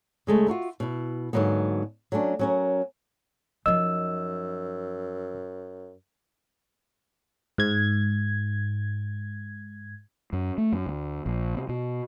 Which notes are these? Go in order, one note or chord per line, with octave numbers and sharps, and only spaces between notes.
C#3 G#3 A3
F4 F#4 A#4 E5
B2 E4
G#2 D3 F#3 A#3 B3
F#3 A3 C#4 D4
F#3 C#4 A#4
F#2 F3 D#4 D#5 E6
G#2 G#6
F#2
A3
F#2
D2
A#1
C3
B2